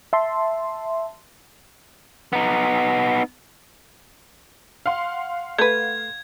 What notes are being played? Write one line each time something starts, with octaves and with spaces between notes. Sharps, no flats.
E5 A5 C6
B3 D#4
F5 F#5 C6
A3 B4 G#6